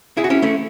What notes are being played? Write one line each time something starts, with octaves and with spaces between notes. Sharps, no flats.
E4 G#4
F#4
C#4 E4
A3 C#4